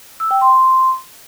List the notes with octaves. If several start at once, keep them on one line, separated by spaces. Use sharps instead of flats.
E6
G5
C6